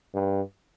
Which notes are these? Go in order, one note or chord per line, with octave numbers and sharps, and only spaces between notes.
G2